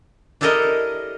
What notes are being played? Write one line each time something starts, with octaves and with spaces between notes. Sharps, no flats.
D4 E4 G4 A4 A#4 D#5